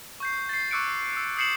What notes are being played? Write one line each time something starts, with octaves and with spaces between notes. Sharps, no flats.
C#6 G6 C7
A6 C7
C#6 D6 E6 F#6 C#7 D7
E6
D#6 G6 C7 C#7 E7 F#7